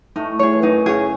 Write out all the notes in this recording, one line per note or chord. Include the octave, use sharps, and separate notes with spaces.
A2 A3 D#4
G#4 C#5
E3
F#2 F#3 D#4
C#3 G#4 C#5